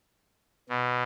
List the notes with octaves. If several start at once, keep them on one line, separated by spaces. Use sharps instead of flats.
B2